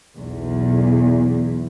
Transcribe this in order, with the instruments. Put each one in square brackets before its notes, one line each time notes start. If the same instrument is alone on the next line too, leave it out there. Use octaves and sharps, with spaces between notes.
[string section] B1 E2